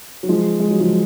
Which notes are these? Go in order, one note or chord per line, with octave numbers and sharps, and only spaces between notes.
F#3
F3 G#3
G#3
F#3
F3 G#3